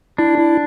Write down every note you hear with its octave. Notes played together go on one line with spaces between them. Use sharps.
D4 E4
E4